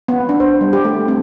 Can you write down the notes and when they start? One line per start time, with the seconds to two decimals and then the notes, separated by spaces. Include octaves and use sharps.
0.08 B3
0.29 D4
0.40 C5
0.61 G3
0.73 G4
0.85 A3
1.08 C4